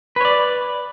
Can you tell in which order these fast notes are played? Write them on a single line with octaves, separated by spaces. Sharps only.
B4 C#5 D5